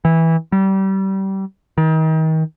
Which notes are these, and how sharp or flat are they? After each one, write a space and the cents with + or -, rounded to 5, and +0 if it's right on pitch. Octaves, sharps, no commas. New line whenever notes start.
E3 -15
G3 -25
D#3 +35